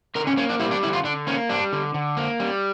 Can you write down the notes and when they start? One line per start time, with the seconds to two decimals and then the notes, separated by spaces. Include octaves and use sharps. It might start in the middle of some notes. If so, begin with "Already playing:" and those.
0.15 D3 A#4
0.27 C#4
0.37 A#3 C#4
0.49 D4
0.60 G3 E4
0.71 D4
0.83 D3 E4
0.93 F4
1.04 D3 D4
1.27 A#3 C#4
1.49 G3 D4
1.73 D3
1.94 D3
2.17 A#3
2.40 G3